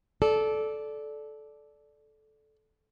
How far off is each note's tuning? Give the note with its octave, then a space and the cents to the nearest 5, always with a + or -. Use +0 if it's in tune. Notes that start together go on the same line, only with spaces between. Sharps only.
A4 -15 D5 +0